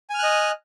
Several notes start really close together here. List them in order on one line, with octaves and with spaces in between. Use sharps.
G#5 F6 F#6 D#5